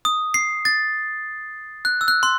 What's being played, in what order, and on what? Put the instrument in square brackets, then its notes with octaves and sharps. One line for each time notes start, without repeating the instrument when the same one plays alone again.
[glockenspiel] D#6
C7
A6
F#6
E6
F#6
C6